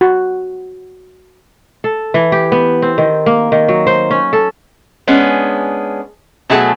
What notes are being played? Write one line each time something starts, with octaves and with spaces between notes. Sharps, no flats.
F#4
A4
E3
G4
B3
C4
D#3
A#3
D#3
F#3
C5
C#4
A4
G#3 B3 C#4 D4
B2 F#3 A3 F#4 G#4 A5